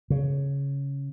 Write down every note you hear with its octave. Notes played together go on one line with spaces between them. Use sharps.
C#3